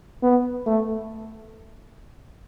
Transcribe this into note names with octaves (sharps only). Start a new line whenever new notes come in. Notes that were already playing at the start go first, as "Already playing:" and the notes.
B3
A3